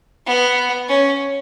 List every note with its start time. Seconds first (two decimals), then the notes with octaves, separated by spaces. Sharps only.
0.26 B3
0.88 C#4